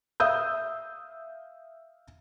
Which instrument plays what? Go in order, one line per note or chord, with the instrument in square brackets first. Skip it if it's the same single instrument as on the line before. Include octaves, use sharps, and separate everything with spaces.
[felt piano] E5 F5 D#6 E6 G6